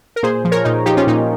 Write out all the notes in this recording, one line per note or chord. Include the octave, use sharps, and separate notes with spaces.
A#4
A#2 G#4 C5
F3
A#4 C#5
A#2 D#4
F3 D#4 G4
C#4 F4
A#2 D#4